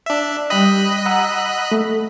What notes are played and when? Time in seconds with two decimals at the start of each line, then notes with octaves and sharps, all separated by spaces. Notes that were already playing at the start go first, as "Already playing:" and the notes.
0.06 D4 E5
0.50 G3 D#5 G5 B5 D#6 F#6
1.06 F#5 A#5 E6
1.71 A3